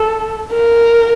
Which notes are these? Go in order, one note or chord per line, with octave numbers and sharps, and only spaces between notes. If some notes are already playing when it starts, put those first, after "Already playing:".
Already playing: A4
A#4